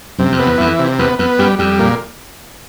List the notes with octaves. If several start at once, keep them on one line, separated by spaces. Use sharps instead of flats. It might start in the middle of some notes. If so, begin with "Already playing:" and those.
F#2 C3
F2
B3
E2
F2 E3
C3
E2 B3
F2 B3
F#2 G3
F2 G3
A#2